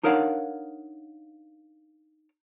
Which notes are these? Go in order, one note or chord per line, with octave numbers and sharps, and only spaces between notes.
D4 D#4 A#4 C#5 F5 F#5